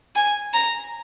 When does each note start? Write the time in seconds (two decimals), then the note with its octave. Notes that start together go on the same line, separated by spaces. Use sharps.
0.16 G#5
0.54 A#5